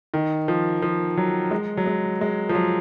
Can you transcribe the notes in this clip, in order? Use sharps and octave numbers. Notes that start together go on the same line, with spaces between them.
D#3
F3
F3
F#3
G#3
F#3
G#3
G#3
F3
F#3